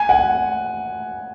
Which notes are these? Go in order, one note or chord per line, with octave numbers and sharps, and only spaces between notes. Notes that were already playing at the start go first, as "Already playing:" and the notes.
Already playing: G#5
F#5